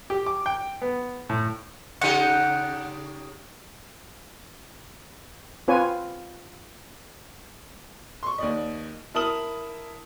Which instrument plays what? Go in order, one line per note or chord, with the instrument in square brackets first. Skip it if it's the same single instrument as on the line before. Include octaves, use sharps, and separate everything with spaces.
[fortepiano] G4
D6
G5
B3
A2
[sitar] C#3 D#4 G4 [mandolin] F#5
[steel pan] C4 F4 B4 C#5 G#5
[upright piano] C6 C#6
D#2 D5 D#5
E4 A#4 A5 D#6 F6 F#7